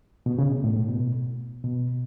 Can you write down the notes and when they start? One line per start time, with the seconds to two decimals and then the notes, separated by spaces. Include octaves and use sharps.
0.26 B2
0.39 C#3
0.51 B2
0.64 A2
0.76 A2
0.89 B2
1.64 B2